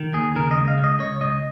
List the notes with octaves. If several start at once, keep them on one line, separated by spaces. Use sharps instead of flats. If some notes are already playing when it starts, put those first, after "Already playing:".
Already playing: D#3
D#2 G#4
C#3 A#4
D#5
C#2
F5
C#2
D#5
C#2 C#5
C#2 D#5